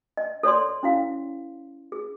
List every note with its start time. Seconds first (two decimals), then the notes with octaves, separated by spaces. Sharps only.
0.17 D#5
0.43 A4 C#5 D5 C6
0.83 C#4 E4 F5
1.92 G#4